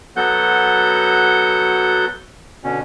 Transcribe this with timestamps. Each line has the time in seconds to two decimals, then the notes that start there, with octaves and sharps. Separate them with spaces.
0.16 F#3 B3 F#4 A4 F#5 G6
2.64 B2 D3 C#4